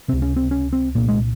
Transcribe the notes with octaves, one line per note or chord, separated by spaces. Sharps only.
C#2 C3 C4
C#4
C4
C#4
C4
C2 A#2 A#3
G#3